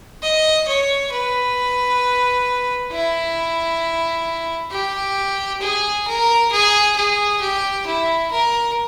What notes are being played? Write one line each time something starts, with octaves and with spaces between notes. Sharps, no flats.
D#5
C#5
B4
E4
G4
G#4
A#4
G#4
G#4
G4
E4
A#4